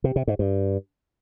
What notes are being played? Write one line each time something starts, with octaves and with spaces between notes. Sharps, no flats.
C3
C3
G#2
G2